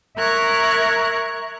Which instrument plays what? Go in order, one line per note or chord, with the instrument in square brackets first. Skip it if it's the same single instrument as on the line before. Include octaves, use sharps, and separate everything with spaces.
[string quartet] A#4 E5 A#5 C#6 F#6 G#6